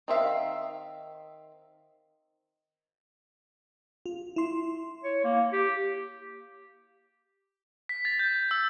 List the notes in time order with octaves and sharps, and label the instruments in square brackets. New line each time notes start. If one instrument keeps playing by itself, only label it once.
[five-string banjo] D#3 C4 E5 F5
[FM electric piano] F4
E4 C6
[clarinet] C#5
A#3
G4
[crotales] B6
A6
G6
E6